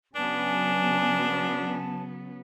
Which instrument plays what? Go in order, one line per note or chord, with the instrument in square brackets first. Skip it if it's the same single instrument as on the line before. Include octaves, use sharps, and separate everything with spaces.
[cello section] C#3 F#3 B3 [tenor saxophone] D4 [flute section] G#5 A5